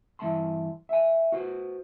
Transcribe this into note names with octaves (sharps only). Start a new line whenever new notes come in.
G2 E3 A#3 E5 A5 C6
E5 G#5
F#4 B4 C5